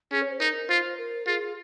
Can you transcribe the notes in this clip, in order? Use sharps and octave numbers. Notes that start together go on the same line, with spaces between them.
C#4 G#4
C#5
C5
D#4 A#4
F4 C5
A#4
F4 G#4